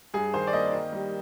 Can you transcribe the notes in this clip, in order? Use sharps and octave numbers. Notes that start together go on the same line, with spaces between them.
G2 G#4
D#3 C5
D5
A#3 D#5
D#3
G3